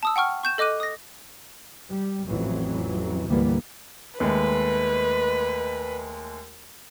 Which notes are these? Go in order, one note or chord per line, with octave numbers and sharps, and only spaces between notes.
A5 D#6 E6
F#5 G5 C#6 F6
C#6 G6 E7
A4 D#5 D6 F#6 D#7
D#6 A#6
G3
A1 F2 E3 F#3
D2 G#2 E3 G3 A#3 B3
D#2 G#3 A3 B4